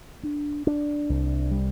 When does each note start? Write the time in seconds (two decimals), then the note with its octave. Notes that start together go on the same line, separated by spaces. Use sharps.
0.23 D4
0.67 D4
1.09 C2
1.51 G3